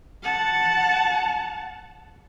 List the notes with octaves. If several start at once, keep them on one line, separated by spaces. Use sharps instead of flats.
F#5 A5